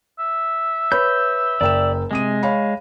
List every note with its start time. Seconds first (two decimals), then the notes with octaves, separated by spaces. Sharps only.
0.19 E5
0.92 B4 C#5 B5 G6
1.61 F#1 D5 G5 E7
2.11 C3 G#3 D#6 D#7
2.43 C#5 F5 B5